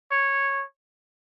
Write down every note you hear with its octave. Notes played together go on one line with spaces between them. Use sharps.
C#5